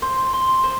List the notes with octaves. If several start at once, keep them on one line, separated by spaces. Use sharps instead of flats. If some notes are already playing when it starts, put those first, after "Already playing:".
C5
C6
C5